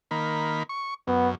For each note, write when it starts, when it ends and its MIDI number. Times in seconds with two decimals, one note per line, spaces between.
0.11 0.63 51
0.11 0.63 58
0.11 0.63 83
0.69 0.94 85
1.08 1.35 42
1.08 1.29 59